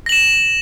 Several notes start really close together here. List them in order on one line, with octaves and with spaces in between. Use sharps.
A#6 F#7 E7